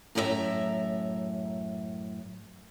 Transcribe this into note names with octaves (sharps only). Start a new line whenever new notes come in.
F#2 A2 D#4 A4 E5 A#5